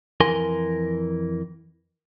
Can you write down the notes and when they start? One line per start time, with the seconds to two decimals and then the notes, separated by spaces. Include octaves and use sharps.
0.20 F2 E3 A#4 G#5 C6